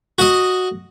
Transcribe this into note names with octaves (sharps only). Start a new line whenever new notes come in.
F#4 D#5